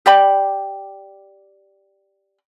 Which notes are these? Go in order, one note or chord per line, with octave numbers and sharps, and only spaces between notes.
G4 D5 G5 B5